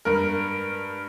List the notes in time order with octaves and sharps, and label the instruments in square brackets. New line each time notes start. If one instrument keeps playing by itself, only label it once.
[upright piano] G2 A#4